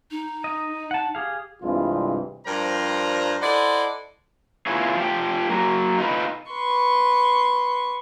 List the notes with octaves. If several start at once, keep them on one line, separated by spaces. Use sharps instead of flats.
D#4
D#5
F#5 A5
G4 G#4 F5
C2 G2 C3 E3 G#3 F4
G2 F3 G3 A#4 C5 A#5
E4 A4 C5 D5 D#5 F#5
E4 F4 G#4 B4 C#5
F3 G4
F#3 A#3
D#4 F4 B4
B4 C6 C#6